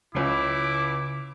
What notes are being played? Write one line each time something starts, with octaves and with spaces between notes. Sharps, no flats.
C#2 C#3 C#4 E4 D6 C7